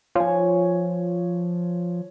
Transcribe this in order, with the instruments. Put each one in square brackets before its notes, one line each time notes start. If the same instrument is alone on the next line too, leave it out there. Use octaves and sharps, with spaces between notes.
[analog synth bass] F3 [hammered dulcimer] C#5 G#5